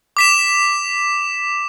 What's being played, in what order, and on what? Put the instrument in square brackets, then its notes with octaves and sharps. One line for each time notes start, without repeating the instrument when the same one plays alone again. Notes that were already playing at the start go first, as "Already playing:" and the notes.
[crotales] D6 B6 E7